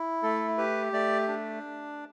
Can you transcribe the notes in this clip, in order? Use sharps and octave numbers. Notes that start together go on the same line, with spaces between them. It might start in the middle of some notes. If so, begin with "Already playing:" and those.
Already playing: E4
A3 A4
G4 B4
A3 D5
D4